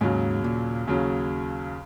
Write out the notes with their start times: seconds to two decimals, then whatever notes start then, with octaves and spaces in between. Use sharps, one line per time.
0.01 D#2 G#2 C#3 F#3
0.44 A#2
0.87 D#2 C#3 F#3